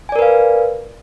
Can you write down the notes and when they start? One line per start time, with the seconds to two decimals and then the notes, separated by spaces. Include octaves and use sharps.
0.09 G#5
0.12 D5
0.16 A#4
0.19 B4
0.22 F5